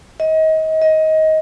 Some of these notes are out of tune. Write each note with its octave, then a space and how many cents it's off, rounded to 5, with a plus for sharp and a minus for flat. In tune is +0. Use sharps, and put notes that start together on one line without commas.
D#5 +30
D#5 +20